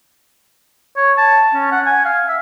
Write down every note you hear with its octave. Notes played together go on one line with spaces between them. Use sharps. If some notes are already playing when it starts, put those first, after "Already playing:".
C#5
A5
C#4
F#5
G#5
F5
E5